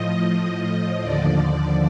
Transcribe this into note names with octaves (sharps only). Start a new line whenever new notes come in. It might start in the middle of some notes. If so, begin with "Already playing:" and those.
Already playing: A2 F3 D#5
D#2 D3 F3 D5